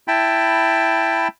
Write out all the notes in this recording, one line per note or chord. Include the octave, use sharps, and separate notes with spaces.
E4 G5 A5 B5